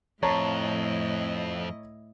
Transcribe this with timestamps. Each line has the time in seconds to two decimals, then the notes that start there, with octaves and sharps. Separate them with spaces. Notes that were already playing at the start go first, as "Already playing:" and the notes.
0.23 F2 A2 E4 C#5 D#5 A5 A#5